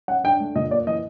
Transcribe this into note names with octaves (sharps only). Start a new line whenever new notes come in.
C#4 F#5
D4 G5
A3
A#2 D#5
A#3 D5
E3 D#5